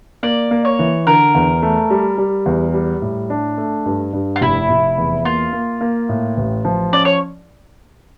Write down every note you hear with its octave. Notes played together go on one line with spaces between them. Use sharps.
A#3 D5
A#3
C#5
E3
D3 A#4
E2
A3
G3
G3
E2
G3
A2
D4
A3
G2
G2
F4
F1 E4
F1
E2
A#3 F4
A#3
A#3
A2
A1
F3
C#4 D5
C#5